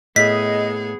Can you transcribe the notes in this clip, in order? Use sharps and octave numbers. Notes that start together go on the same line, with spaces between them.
A2 B3 G#4 D#5 B6